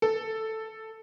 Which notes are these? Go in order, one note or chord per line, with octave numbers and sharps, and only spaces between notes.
A4